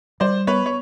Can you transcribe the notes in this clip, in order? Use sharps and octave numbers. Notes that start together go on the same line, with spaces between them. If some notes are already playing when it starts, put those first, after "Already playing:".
G3 C5 D5
B3 B4 C#5
C#5